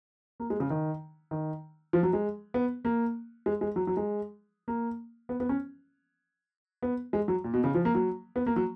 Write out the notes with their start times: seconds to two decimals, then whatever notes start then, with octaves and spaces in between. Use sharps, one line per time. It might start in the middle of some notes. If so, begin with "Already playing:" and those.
0.40 A#3
0.50 G#3
0.60 C#3
0.70 D#3
1.31 D#3
1.93 F3
2.03 F#3
2.13 G#3
2.54 B3
2.85 A#3
3.46 G#3
3.61 G#3
3.76 F#3
3.87 F#3
3.97 G#3
4.68 A#3
5.29 B3
5.40 B3
5.49 C#4
6.82 B3
7.13 G#3
7.28 F#3
7.44 A#2
7.54 B2
7.64 C#3
7.75 F3
7.85 A#3
7.95 F#3
8.36 B3
8.46 A#3
8.56 F#3